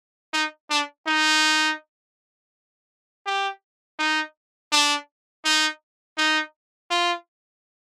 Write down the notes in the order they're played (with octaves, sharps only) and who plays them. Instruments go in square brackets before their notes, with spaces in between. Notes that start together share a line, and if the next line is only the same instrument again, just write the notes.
[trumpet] D#4
D4
D#4
G4
D#4
D4
D#4
D#4
F4